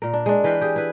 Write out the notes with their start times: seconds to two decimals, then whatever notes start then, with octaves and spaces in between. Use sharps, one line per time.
0.02 A#2 A#4
0.13 D4
0.26 G#3 D4
0.44 E3 B4 F5 G5
0.61 G4 G#4
0.76 E4 B4